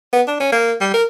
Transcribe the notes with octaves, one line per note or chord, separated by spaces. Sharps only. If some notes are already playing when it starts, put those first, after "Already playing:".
B3
D4
C#4
A#3
G3
A#4